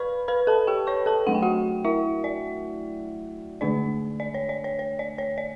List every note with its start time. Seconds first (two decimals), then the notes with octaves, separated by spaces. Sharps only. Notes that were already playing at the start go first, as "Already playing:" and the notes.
Already playing: B4 D5 B5 C#6
0.28 B4 B5
0.47 A4 A5
0.67 G4 G5
0.87 C#5 C#6
1.06 A4 A5
1.27 F#3 A3 D4 F#5
1.35 G5
1.42 F#4 F#5
1.84 E4 E5
2.24 D5
3.61 D3 A3 D4 D5
4.20 D5
4.34 C#5
4.49 D5
4.64 C#5
4.79 C#5
4.99 D5
5.18 C#5
5.38 D5